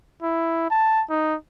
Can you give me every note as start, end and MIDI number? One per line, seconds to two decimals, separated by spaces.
0.22 0.69 64
0.70 1.03 81
1.09 1.35 63